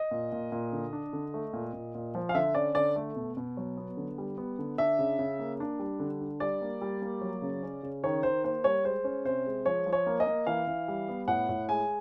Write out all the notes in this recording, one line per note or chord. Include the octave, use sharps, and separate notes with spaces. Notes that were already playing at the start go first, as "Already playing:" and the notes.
Already playing: D#5
A#2
A#2
A#2
D3
D4
D3
A3
A#2
A#2
A#2
F3
F5
D3 E5
C#4 D5
D3 D5
A3
B2
B2
F#3
B3
D3
G3
B3
D3
D4 E5
C#3
C#3
A#3
D4
G3
D3
D4
G3 D5
A#3
G3
A#3
F#3
C#3
C#4
C#3
D#3 C#5
D#3 C5
A#3 C5
G3 C#5
G#3 C5
C#4
C3 C5
G#3
F3 C#5
F3
C#5
A#3
D#5
A#3
E3 F5
E3
G3
B3
A2 F#5
A2
G#3 G#5